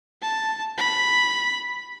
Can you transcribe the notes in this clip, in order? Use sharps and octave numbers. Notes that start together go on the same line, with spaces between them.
A5
B5